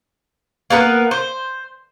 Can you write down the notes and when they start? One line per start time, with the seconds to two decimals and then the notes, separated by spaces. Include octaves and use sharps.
0.70 A#3 B3 A#4 B4
1.11 C5